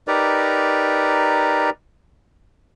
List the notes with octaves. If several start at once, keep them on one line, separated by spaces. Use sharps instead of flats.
D#4 G4 A#4 B4 D5 A#5